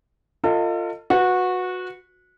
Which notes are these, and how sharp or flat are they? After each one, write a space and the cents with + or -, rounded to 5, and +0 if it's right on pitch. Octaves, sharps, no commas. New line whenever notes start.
F4 +0 A4 +40 D#5 +5
F#4 -20 B4 +0